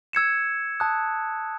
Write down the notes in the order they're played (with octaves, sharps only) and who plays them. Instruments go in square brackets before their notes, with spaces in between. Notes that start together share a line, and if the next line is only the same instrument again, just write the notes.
[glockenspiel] E6 G#6 C#7 E7
A5 D#6 F#6